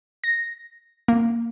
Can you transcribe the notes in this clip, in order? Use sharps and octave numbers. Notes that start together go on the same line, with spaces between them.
A#6
A#3